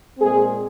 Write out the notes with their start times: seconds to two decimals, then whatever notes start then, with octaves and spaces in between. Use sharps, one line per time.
0.18 A#2 G#3 C4 G#4